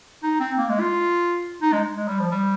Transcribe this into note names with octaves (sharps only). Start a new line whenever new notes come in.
D#4
C4
A#3
G#3
F4
D#4
G#3
G#3
G3
F3
G3